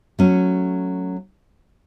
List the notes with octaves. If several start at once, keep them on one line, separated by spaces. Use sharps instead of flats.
F#3 A3 C#4